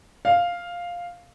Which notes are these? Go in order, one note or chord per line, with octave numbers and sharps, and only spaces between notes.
F5